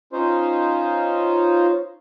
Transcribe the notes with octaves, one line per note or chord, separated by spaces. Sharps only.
C#4 D#4 F4 C5